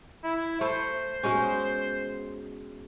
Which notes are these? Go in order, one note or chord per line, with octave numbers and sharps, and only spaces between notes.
E4
A3 C5
B2 G#3 C#4